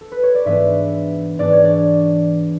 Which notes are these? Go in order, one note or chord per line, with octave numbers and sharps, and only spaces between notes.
A4
B4
C#5
D5
G#2 E3 B3 D4 E5
G#2 E3 B3 D4 D5
C#5
D5